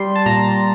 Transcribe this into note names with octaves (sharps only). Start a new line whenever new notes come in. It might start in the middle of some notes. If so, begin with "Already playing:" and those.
Already playing: G3 C6
A5
A#2 A#5